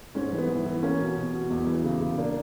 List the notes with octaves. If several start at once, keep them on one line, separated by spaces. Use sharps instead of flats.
G#2 C#4
E3
B3
E3
E3
A#3 C#4
B2
B2
B2
E2
E3
C#3
C#3
A#3 D4